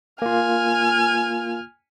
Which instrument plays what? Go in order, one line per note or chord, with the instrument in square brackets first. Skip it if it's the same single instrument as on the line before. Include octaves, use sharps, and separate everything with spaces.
[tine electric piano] A#3 F4 [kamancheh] G#5 F6